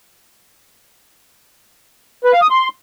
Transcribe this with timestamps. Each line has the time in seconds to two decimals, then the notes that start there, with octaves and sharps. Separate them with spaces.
2.24 B4
2.33 F5
2.42 D#6
2.50 C6